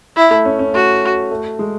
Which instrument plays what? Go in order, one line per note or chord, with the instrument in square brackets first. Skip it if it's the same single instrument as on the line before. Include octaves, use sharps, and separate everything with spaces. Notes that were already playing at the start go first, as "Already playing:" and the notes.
[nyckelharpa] E4
[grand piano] A3
C#4
C#4
[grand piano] A3 [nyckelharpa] F#4
[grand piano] A3
G#3